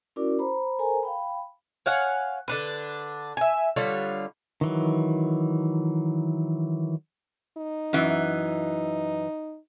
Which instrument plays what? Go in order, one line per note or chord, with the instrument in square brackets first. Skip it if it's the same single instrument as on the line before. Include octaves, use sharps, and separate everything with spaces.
[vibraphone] C#4 E4 F#4 A#4 D5 D6
C5 A#5 B5
A4 A#4 C5 G#5 A#5
F5 G5 B5
[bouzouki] C#5 F5 F#5 G#5
D3 D4 B4
E5 G#5
D3 G3 F4 C#5
[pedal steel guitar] D#3 E3 F#3
[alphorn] D#4
[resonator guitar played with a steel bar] F#2 E3